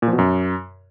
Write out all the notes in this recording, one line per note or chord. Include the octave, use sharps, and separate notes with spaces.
A#2
F3
B2
F#2